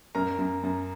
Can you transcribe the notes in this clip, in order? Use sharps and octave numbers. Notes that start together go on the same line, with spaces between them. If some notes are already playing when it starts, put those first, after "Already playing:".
F#2 A#4 A#5
F#2
F#2